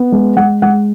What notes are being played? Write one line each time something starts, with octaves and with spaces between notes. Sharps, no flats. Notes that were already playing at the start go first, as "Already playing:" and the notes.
Already playing: B3
G#3
G#3 F#5
G#3 F#5